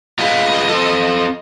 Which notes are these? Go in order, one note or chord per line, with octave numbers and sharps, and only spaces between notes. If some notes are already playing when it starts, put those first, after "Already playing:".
F4 G#4 B4 D#5
C4 A4